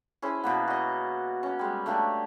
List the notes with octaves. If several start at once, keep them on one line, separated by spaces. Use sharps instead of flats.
C#4 E4 G#4 C5
B2 A#3 B3
F#4 D#5
C#4
G3 G#3
A3 A#3 D4 G4